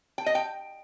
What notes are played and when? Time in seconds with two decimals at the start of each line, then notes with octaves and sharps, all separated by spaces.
0.18 G5
0.26 D#5
0.35 G5